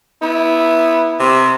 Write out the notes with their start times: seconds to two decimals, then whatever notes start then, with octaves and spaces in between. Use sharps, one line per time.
0.22 B3 E4
1.19 C3